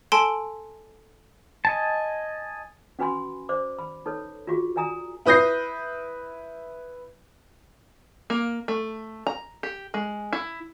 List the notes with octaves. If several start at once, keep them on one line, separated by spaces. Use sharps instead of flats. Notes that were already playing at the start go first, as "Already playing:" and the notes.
A4 G#5 A5 C6 D7
D#5 G#5 A5
C#4 F#4 B4 G#5 B5 C6
C5 D5 D6
B5
D#4 A4 B4 C#5
F4 F#4 G#4
A#4 D5 G#5 A#5 D#6
E4 B4 D#6 G6 A#6 C7
A#3
A3
A#5
G4
G#3
E4